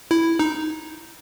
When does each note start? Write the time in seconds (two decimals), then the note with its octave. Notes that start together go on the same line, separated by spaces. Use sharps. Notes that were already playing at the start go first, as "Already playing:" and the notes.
0.11 E4
0.39 D#4